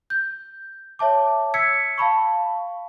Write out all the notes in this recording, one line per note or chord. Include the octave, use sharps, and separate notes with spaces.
G6
C#5 E5 A5 D6
E6 G#6 B6 C#7
F5 A5 B5 C#6